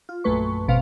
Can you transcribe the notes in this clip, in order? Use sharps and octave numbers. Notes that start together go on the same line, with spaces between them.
F4
A#1 F#2 A3 B4 C#6
G#1 B2 C4 F5